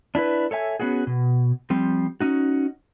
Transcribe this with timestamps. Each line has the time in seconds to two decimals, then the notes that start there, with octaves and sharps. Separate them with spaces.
0.15 D4 E4 F4 B4
0.51 A4 C#5 E5 G#5
0.80 B3 C#4 F#4 G#4
1.07 B2
1.70 F3 G3 C4
2.21 C#4 D#4 F#4